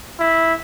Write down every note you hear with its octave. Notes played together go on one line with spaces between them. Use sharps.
E4